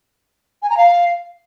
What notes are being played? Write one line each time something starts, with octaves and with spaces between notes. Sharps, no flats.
G#5
A#5
F5